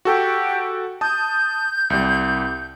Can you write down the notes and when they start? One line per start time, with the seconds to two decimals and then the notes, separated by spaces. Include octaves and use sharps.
0.05 F#4 G4 A4
1.01 A5 D#6 G6
1.90 C2 G3